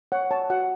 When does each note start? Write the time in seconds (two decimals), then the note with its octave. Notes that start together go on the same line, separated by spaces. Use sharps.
0.12 C#5 F#5
0.31 C#5 A5
0.50 F#4 F#5